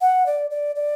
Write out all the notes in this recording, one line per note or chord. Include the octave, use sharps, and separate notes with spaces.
F#5
D5
D5
D5